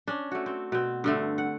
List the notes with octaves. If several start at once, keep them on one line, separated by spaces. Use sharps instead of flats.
C#4 D4
A3 F#4
C4
B2 C4
G2 D3 A3
F#5